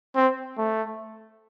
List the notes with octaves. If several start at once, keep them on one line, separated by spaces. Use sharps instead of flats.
C4
A3